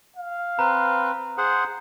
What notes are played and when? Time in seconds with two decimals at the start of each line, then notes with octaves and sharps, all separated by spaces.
0.16 F5
0.59 C4 B4 A#5
1.38 G#4 C5 F#5